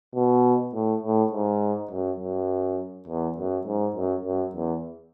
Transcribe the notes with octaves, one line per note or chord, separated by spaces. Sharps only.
B2
A2
A2
G#2
F#2
F#2
E2
F#2
G#2
F#2
F#2
E2